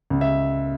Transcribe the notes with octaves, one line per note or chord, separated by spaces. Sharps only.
C#2
E5